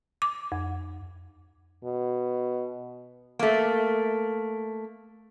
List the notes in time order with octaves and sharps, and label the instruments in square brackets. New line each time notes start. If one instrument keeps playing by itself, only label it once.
[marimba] D6
F2
[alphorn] B2
[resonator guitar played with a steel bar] A3 A#3